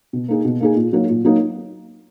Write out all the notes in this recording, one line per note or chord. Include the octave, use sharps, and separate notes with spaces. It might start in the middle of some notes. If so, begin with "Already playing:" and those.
B2
A#3 D#4 G#4
B2
A#3 D#4 G#4
A#2
F#3 A#3 D#4
A#2
F#3 A#3 D#4